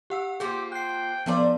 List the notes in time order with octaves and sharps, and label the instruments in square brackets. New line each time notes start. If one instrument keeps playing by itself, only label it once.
[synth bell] G4 F#5 E6
[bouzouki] F3 A#3 C4 [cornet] G4 [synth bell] G#4
[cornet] G5 [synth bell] F#6 C7
[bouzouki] A2 C5 D5 [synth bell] F3 B3 A5